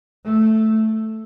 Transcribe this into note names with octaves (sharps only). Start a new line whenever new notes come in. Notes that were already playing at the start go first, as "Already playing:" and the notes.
A3